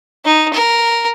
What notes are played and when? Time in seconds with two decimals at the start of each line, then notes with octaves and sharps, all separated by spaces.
0.25 D#4
0.53 A#4